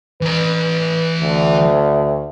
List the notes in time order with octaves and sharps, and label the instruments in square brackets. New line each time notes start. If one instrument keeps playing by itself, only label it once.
[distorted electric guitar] E3 A#5 [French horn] B4
[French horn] D2